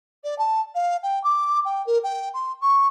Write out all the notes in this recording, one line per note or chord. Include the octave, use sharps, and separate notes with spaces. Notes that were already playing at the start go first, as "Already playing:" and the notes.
D5
A5
F5
G5
D6
G5
A#4
G5
C6
C#6